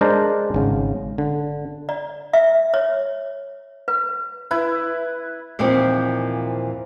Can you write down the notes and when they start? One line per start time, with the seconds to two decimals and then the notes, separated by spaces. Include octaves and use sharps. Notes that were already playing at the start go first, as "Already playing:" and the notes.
0.01 G#3 D4 A#4 C5 A5 A#5
0.54 G#1 C#3
1.18 D3
1.89 D5
2.33 E5
2.74 C#5
3.88 B4
4.51 E4 B4
5.59 D#2 A#2 E3 F3 C4